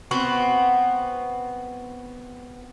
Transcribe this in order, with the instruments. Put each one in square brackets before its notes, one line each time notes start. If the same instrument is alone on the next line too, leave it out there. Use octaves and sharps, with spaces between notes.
[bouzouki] B3 C4 F#4